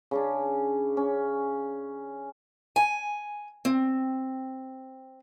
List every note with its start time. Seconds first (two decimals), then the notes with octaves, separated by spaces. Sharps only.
0.11 C#3 C#4 D4
0.97 C#4
2.76 G#5
3.65 C4